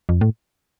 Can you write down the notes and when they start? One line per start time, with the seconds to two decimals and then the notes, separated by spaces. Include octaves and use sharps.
0.09 F2
0.21 A2